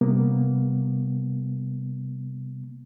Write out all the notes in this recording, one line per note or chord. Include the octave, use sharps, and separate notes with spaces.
C3 G3 A#3 B3